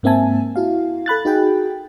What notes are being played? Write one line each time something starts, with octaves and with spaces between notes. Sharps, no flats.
G#2 A#3 C4 E5 G#5 A5
E4 F#4 F5
A4 B5 F#6 A6
D#4 F#4 G#4 G5